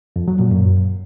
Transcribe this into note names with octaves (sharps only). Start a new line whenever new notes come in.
F2
F#3
A#2
F#2